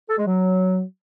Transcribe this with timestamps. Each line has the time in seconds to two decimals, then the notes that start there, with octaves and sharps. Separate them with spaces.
0.09 A4
0.18 G#3
0.26 F#3